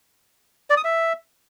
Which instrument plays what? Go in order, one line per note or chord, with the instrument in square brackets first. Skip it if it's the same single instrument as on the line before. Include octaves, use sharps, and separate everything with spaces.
[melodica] D5
D#6
E5